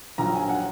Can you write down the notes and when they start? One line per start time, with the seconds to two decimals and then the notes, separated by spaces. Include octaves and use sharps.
0.18 A#1 A#2 F#3 A#5
0.35 G#5
0.49 F#5